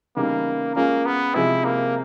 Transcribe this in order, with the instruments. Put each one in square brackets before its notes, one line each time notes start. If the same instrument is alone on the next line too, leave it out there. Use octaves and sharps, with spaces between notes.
[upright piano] C#3 E3 G3 B3 D#4 [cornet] A#3
[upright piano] G#3 C#4 F4 [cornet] A#3
[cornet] B3
[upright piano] C3 F3 G#3 [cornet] E4
[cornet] A#3